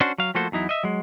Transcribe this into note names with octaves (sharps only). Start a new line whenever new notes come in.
C#4 D4 F#4 C5
F#3 F5
F3 A3 A#3 F#4 A4 C5
E2 F#3 D#4 E4
D#5 E5
F#3 G#3